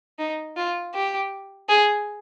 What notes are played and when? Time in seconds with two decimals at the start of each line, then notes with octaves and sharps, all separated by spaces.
0.19 D#4
0.57 F4
0.94 G4
1.69 G#4